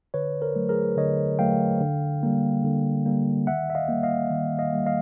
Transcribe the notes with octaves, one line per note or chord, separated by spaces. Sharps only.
D3 B4 C#5
A#4 C5
F#3 A3
G#4 A#4
D3 C#5 D#5
F#3 A3 F5 G5
D3
G3 A#3
D3
G3 A#3
D#3 E5 F#5
E5
D#5 F5
G3 A#3
D#5 F5
D#3
D#5 F5
G3 A#3
D#5 F5